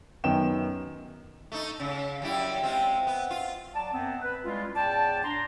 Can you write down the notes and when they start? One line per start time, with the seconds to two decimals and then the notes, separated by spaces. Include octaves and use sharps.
0.24 F#2 D#3 B3 G5 E7
1.52 A3 D#4
1.80 C#3
2.22 F#2 G3 E4
2.62 G#3 C4 F4
3.07 B3
3.31 F4
3.74 F#3 D5 A5
3.93 F#2 B3 C4
4.22 B4
4.44 G3 G#3 C#4 E4 F4
4.75 E2 A2 D5 G5 A5
5.23 D4 A#5 C6